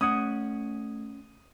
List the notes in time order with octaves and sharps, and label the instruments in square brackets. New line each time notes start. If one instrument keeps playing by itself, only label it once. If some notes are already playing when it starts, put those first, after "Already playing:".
[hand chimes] A3 G#6 [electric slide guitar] C#4 F#5 [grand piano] D#6